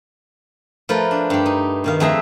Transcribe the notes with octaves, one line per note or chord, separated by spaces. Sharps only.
F3 A3 A#4 B4
D4
G2 G4
D#4
B2 D#3 F5
F2 A3 G#4 E5 A#5